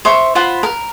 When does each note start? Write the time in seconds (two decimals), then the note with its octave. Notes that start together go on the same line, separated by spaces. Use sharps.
0.05 C5 E5 C#6
0.35 F4 C5 F#5 B5
0.63 A#4